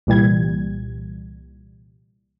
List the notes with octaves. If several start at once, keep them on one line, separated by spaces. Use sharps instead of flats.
C2 A#2 E3 G3 G#6